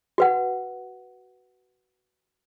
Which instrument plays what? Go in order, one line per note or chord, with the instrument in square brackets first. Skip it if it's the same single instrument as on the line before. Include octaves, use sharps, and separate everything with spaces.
[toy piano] F#4 B4 F#5